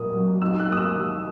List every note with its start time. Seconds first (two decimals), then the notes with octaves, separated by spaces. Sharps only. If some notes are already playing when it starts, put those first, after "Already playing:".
Already playing: A#2 A#3 D#6
0.14 F#3
0.41 D#4 E6
0.59 F#6
0.68 A#3 D#6
0.77 E6
0.96 D#2